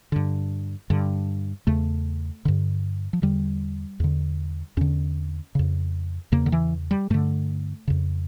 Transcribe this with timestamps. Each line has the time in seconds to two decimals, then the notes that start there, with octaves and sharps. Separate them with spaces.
0.12 G2 D3
0.90 G2 D3
1.67 E2 C#3 A3
2.45 G2 D3
3.13 F3
3.22 E2 D3 G3
4.00 E2 D3
4.77 E2 D3 C#4
5.55 F2 C#3
6.32 E2 C#3 A#3
6.46 D3
6.52 E3
6.91 G3
7.10 G2 D3 A3
7.88 F2 C#3